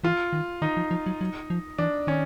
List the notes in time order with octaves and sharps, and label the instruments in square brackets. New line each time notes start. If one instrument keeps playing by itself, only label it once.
[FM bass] E3 [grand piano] F4
[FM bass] D#3
[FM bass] D#3 [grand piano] D#4
[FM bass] F3
F3
F#3
F#3
F3
[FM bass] E3 [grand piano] D4
[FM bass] D#3 [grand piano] C#4